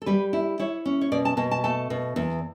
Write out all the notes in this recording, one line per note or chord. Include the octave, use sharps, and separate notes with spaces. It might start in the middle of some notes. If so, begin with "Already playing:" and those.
A4
G3 B4
E4
E4 C#5
C#4
C#5
B2 D5
A5
B2 A5
A5
A3 A5
B2
E2